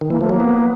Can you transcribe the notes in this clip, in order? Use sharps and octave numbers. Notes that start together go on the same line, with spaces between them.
D#3
E3 A#3
F3 A3
F#3 A#3
B3